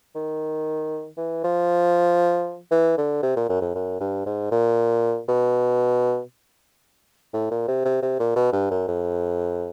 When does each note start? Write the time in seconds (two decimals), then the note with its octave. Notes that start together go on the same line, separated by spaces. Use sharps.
0.15 D#3
1.17 E3
1.44 F3
2.71 E3
2.98 D3
3.22 C3
3.36 A#2
3.49 F#2
3.61 F2
3.75 F#2
4.00 G2
4.26 G#2
4.51 A#2
5.28 B2
7.33 A2
7.51 A#2
7.68 C3
7.85 C3
8.02 C3
8.19 A#2
8.36 B2
8.53 G2
8.71 F#2
8.88 F2